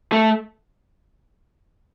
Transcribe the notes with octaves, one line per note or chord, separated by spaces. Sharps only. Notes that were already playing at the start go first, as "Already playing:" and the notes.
A3